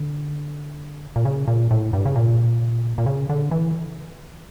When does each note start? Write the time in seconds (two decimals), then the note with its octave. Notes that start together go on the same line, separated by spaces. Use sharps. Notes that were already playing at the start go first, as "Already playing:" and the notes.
Already playing: D3
1.16 A#2
1.25 C#3
1.48 A#2
1.71 A2
1.93 G2
2.05 C#3
2.16 A#2
2.98 A#2
3.06 C#3
3.29 D3
3.51 E3